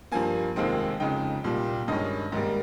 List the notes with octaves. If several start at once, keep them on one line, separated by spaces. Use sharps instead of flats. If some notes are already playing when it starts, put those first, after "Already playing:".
G2 F3 A#3 G#5
F1 D#2 D#3 G#3 C4
F2 C#3 G#3 D#4 G5
C2 A#2 G3
G2 D#3 G#3 C#4 D#5
G#2 D#3 G3 A#3